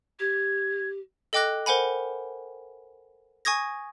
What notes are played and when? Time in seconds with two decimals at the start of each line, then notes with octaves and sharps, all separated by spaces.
0.19 G4 G#6
1.33 A4 D#5 G5 D6 F#6 A#6
1.66 A#4 C5 F#5 G#5 B5
3.45 G#5 C#6 D#6 G#6 A#6